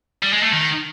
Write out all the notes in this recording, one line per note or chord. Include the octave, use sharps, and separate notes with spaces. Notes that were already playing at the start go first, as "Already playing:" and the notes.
G3
G#3
A3
D#3